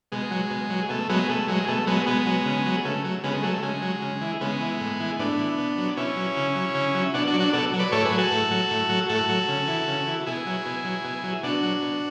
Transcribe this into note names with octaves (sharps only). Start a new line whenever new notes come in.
B2 G#3
F#3
B2
F#3
B2 A3
F#3 G#3 B3
B2 A3
F#3 G#3
B2 A3
F#3 G#3 B3
B2 G#3 B3
F#3
C#3
F#3
C#3 A3
F#3
C#3 G#3 B3
G#3
F#3 A3
A3
C#3 G#3
F#3
C#3
E3
C#3 G#3 B3
E3
A2
E3
A2 B3 D4
E3
B2
F#3
B2 C#4 E4
F#3
C#3
F#3
C#3
F#3
B2 D4 F#4
D4 F#4
F#3
D4 F#4
B2 F#4 A4
F#3
B4 D5
A2 A4 C#5
G#4 B4
F#3
F#4 A4
A2
F#3
A2
F#3
A2 F#4 A4
F#3
C#3
E3
C#3
E3
B2 E4 G#4
F#3
B2
F#3
B2
F#3
B2 D4 F#4
F#3
B2